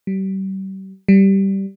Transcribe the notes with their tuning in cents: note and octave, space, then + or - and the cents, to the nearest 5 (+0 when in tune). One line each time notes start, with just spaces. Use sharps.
G3 -35
G3 -10